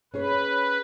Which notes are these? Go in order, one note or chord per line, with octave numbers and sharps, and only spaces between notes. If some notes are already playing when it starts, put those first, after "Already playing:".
C#4 G#4 B4 C#5